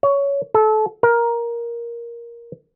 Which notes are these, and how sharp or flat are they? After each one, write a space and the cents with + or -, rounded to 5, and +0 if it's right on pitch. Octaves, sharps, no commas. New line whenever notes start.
C#5 +15
A4 -25
A#4 +10